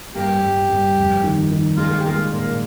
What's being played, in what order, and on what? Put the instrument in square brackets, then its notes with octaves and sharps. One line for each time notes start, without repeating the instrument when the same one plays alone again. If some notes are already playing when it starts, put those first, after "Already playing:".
[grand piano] G2 [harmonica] A#3 G4
[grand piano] G2
G2
F1
D#3
D#3
[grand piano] G#3 [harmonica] A#3 F4
[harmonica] G4
[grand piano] G#3 [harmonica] A#3 F4
[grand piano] A#2 [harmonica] A#3